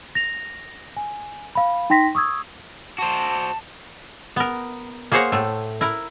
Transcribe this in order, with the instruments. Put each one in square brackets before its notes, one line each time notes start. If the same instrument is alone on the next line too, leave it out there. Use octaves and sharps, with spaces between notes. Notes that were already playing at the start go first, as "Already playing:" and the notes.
[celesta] A#6 F7
G#5
F5 B5
D#4 G5 C6 A#6 B6
C#6 D#6 E6 G#6
[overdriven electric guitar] F#4 C5 [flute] A5
[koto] B3 A#4
A#3 G#4 C5 C#5 F#5 A#5
A2 A3
E4 A#4